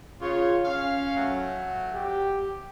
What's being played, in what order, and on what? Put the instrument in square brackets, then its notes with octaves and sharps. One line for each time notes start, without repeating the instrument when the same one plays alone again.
[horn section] C#3 C#5 [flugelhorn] F4
[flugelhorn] C#4 [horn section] F5
[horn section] F#3 A3
[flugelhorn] G4